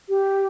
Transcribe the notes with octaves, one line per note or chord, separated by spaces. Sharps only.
G4